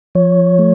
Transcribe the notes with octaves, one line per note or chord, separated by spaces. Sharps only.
F3 C#5
A3